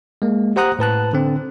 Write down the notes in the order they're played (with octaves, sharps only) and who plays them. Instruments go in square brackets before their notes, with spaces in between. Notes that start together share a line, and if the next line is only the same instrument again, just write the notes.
[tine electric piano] G#3 A#3
G4 C5 F#5 A#5 D#6 F#6
A2 B4 A5 F#6
D3 C4